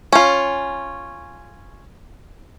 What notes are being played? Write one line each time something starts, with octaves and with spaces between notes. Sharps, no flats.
C#4 F4